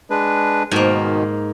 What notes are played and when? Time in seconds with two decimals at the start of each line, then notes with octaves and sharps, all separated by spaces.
0.10 G#3 D4 B4
0.71 G#2 B2 D#3 A#3